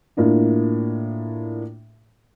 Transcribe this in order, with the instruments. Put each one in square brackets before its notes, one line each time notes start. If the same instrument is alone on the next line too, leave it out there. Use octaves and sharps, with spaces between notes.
[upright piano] A2 A#3 D4 F4